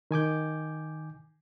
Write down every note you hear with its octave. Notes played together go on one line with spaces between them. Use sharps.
D#3 G#5 D6 G6